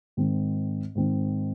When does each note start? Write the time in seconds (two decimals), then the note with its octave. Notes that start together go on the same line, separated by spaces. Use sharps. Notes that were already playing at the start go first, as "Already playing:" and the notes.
0.17 G#2 D#3 C4
0.95 G#2 D#3 C4